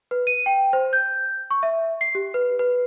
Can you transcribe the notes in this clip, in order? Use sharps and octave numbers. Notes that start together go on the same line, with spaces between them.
B4
D#7
G5
C5
G6
C#6
E5
C7
G4
B4
B4